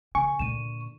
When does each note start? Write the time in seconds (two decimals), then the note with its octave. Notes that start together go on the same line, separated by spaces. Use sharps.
0.15 C#3 G#5 C#6
0.39 A#2 D3 D#7 E7